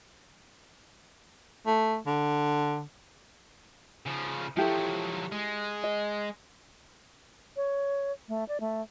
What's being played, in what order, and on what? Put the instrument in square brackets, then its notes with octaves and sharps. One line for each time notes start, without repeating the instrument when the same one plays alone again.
[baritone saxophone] A3
D3
[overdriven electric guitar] C#3 F3
[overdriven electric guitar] F3 F#3 [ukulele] E4 G4 A4
[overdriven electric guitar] G#3
[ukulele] D#5
[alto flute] C#5
A3
D5
A3